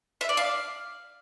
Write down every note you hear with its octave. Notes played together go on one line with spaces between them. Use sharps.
E5
D5
F5